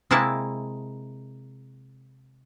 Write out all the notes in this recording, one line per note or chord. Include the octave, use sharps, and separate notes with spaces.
C3 G#3 A#3 E4 A5